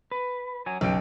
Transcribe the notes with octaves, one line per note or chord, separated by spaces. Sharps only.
B4
F#3 G#5
B1 C#3 F#3 G5